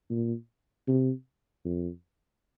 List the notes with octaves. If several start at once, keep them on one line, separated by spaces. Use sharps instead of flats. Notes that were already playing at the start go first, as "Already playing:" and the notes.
A#2
C3
F2